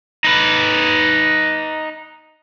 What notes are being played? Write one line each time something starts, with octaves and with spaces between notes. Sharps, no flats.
D#4 B4